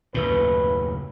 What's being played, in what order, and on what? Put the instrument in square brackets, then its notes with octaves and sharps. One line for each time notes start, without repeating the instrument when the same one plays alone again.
[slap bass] F#1 D#2 A2 [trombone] B4